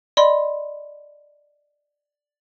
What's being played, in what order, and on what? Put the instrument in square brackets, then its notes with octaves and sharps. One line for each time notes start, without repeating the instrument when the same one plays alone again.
[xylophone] D5 D#5 B5 C6